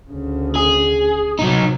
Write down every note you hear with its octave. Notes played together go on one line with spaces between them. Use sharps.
D2 C#3
G#4
C3 F#3 D#4